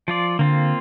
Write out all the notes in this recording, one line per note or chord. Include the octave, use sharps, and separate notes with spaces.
F3 F4 D5
D3 A#3 C4 F4